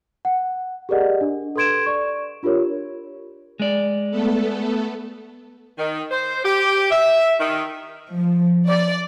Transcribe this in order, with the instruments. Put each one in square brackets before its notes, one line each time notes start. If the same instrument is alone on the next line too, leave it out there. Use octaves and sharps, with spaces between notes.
[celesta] F#5
G4 G#4 A#4 D5 D#5 F#5
D4
A4 B4 C6 G#6 D7 E7
D5 C#6
D4 F4 G4 A#4 C#5
[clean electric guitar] G#3 D5
[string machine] A3 B3 A4
[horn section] D#3
C5
G4
E5
D#3
[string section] F3
D5